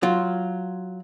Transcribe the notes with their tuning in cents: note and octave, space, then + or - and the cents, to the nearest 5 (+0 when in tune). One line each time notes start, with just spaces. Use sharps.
F#3 +0 F4 +0